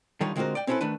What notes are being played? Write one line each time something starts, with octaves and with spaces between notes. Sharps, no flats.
D3 D#3 G3 D#4 F4 C#5
D3 G#3 C4 F4 F#4 A#4
D5 G5
C4 C#4 E4 G#4 A4 B4
D#3 A3 D4 B4